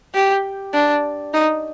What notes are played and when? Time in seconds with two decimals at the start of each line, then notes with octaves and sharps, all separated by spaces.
0.14 G4
0.74 D4
1.34 D#4